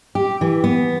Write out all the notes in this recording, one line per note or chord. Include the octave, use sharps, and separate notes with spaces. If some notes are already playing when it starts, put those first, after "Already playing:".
G4
E3
B3